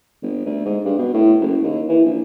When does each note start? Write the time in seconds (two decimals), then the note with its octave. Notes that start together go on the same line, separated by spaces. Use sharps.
0.23 G1
0.46 D2
0.65 G#2
0.85 G2
0.98 B2
1.14 A2
1.41 F#1
1.63 D#2
1.89 E3
2.05 A#1